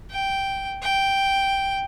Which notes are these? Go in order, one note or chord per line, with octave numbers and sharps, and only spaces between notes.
G5
G5